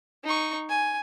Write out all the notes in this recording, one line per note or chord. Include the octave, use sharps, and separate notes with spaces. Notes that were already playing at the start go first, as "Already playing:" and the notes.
D#4 C#6
G#5